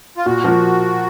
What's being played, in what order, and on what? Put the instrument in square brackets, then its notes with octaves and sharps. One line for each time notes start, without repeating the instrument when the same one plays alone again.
[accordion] F4
[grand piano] A#2 [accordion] F#4
[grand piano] F3 A#3